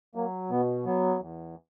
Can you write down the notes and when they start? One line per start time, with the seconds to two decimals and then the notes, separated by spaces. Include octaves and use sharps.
0.15 F#3 A#3
0.50 B2 B3
0.86 F#3 B3
1.21 E2